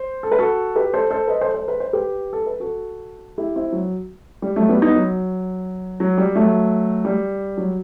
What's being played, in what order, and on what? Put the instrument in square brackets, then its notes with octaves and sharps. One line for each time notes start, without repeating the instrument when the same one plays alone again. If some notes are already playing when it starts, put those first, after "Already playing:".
Already playing: [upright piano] C5
A4
B4
F#4 A4
G4 B4
A4 C5
A4 C5
B4 D#5
A4 C5
A4 C5
B4
C5
G4 B4
A4
B4
F#4 A4
E4 G4
C4 E4
F#3
G3
F#3 A3
G3 B3
B3 D#4
F#3
F#3
G3
F#3 A3
G3
F#3